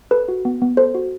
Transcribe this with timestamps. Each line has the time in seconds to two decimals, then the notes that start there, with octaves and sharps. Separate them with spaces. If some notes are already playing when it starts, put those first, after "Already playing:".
0.11 A4 B4
0.28 F#4
0.45 B3
0.61 B3
0.77 A4 C5
0.95 F#4